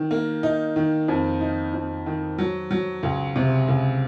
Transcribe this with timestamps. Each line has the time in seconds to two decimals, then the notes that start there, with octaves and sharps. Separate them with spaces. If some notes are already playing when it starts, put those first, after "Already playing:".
Already playing: D#3
0.11 A#3
0.43 D#4
0.76 D#3
1.08 F2
1.41 D#4
1.73 F2
2.06 D#3
2.38 F#3
2.71 F#3
3.03 C#2
3.36 C3
3.68 C#2